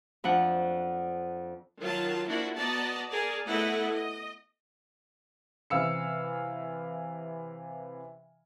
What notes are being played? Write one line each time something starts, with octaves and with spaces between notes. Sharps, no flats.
F2 D4 F#5
D#3 F#3 F4 A5
F3 A#3 D4 E4 F#4
B3 F#4 D5 D#5 A5 A#5
G#4 A#4 D5 A5
A3 B3 E4 A4 D#5 F#5
D#5
C3 E3 F5 E6 C#7